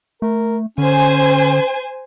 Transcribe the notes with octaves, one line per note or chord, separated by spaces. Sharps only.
A3 A#4
D3 C#4 C5 G#5